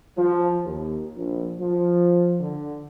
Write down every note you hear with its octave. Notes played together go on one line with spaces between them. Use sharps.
F3
D#2
A#1
F3
D3